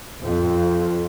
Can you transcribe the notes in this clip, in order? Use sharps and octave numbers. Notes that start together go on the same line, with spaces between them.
F2